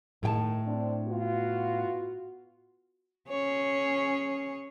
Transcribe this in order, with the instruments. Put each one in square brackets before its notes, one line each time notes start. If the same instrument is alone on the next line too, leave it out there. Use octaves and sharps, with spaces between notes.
[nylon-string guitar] A2 G5 A5 [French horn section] D#3 G#4
[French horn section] C4 D4
B3 F4 F#4
[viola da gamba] C#4 G#4 C#5